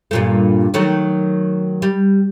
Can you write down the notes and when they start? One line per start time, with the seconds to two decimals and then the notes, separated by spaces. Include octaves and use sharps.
0.11 G2 A#2 A3
0.74 D#3 F#3 A3
1.82 G3